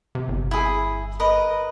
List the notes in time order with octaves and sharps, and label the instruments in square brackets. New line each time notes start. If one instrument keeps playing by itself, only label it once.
[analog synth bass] C3
G1
[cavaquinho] E4 G#4
A#4 B4 D#5